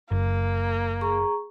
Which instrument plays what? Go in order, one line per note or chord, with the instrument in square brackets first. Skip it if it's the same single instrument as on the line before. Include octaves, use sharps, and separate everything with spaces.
[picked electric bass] F#1 [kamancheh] A#3
[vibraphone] G#4 A#5 C#6